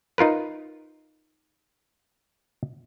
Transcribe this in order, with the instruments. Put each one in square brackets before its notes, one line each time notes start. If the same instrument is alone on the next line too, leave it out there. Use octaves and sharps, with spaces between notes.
[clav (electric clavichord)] D#4 F4 A#4 B4